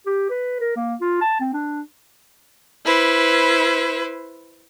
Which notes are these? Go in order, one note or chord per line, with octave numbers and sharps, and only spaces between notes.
G4
B4
A#4
A#3
F4
A5
C4
D4
E4 B4 C5